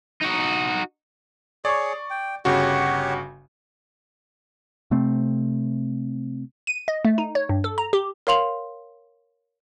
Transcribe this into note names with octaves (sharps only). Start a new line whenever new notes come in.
D#4 F#4
G#4 C#5 D5 C#6
G5
G1 C#3 F#4 G4 C#5 F#5
C3 A3 C4
D#7
D#5
A3
D#4
C#5
G2
A4
A#5
G4
A#4 C#5 F5 C6 F7 F#7